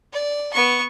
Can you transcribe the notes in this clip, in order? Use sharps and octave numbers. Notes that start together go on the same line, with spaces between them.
D5
B3 C#6